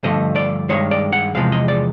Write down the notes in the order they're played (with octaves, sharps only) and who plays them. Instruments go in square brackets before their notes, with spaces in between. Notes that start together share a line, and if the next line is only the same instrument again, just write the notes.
[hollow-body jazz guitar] G2 D3 F3 A3 D#5
D5
G2 D#3 G#3 C#5
D5
F#5
E2 C3 F3 G#3 F5
D#5
D5